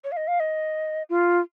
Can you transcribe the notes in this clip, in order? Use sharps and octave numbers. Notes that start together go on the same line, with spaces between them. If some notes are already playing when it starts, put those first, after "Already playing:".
C#5
F5
D#5
F5
D#5
F4